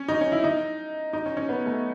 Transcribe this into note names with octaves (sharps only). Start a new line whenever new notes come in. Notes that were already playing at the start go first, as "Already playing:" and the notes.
Already playing: C#4
D#4
C#4
E4
D#4
D#4
C#4
C#4
B3
A3